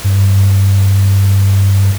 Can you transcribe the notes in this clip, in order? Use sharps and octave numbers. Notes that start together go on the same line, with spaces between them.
G2